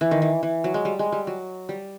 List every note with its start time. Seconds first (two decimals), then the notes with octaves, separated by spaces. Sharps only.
0.01 E3
0.11 D#3
0.22 E3
0.43 E3
0.64 F#3
0.74 G#3
0.85 G3
0.99 G#3
1.12 G3
1.27 F#3
1.69 G3